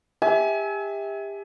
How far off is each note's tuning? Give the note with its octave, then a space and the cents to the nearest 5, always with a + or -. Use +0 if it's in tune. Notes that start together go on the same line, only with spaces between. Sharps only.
G4 +35 E5 -25 G#5 +30